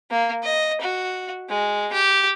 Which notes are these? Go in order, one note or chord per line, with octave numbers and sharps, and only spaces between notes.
A#3
D#5
F#4
G#3
G4